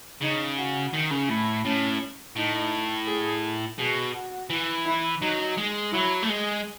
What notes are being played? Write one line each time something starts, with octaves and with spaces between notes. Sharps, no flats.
C#3 D#4
F#4
D#3
C#3
A2 E4
A2 C#4
A2 D#4
G#4
B2 G#4
F#4
E3
E4
F#3 D#4
G#3
F#3 E4
A3
G#3 G#4